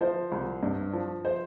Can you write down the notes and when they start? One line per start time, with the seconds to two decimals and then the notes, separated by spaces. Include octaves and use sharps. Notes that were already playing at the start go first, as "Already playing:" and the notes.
0.01 F3 C5
0.32 C2
0.63 G2
0.93 F3
1.25 C5